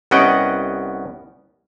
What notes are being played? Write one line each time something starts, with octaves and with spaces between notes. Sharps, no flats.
C2 B3 C#4 D#5 F#5 G5